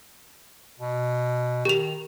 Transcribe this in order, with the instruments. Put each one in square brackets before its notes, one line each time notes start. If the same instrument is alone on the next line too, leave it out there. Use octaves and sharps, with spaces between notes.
[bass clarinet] B2
[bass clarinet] D#3 [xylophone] G4 F7